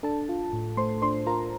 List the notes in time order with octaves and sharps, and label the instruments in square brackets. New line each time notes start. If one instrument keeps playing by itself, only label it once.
[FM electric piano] D4 A4 A5
F4
A2
A3 C5 C6
D4 C5 C6
F4 A#4 A#5